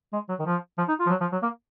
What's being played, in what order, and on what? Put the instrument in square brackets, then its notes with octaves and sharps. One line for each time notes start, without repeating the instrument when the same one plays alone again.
[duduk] G#3
F#3
D#3
F3
F3
D#4
F4
F3
F#3
F3
F#3
A#3